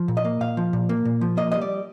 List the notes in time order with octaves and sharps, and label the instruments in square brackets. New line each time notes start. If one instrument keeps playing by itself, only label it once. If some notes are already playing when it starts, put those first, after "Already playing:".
Already playing: [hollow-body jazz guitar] F3
A#2
D#5
A#3
A#2 F5
F3
A#2
A#3
A#2
F3
A#3 D#5
G3 D#5
D5